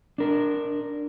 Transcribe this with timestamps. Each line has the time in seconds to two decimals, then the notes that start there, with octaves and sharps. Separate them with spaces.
0.18 D4 A#4